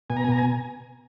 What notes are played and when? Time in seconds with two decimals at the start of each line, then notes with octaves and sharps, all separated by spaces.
0.10 B2 G#5
0.17 A#5
0.24 G#5
0.28 B2 A#5
0.38 G#5